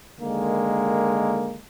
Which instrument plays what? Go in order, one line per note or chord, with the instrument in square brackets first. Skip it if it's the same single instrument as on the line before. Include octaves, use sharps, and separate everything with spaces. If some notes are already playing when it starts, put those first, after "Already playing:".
[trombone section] D3 D#3 G#3 A#3